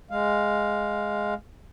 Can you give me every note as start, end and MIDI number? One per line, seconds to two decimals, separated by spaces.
0.10 1.34 56
0.10 1.34 77